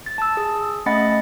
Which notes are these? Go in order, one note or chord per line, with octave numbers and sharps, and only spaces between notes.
A6
A5 E6
G#4
A3 C#4 D#5 F#5 B5 A6